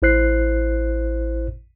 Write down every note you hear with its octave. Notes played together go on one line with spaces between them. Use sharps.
A1 E4 C5 F#6 C7